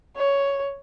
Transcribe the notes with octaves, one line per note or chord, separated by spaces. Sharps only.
C#5